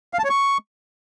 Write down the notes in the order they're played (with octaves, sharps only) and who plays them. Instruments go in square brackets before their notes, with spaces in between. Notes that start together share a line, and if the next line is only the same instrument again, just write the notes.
[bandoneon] F5
A5
C#5
C#6